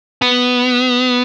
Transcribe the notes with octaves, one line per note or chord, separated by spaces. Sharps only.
B3